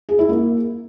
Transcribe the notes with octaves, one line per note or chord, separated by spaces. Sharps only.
G#4
E4
A#3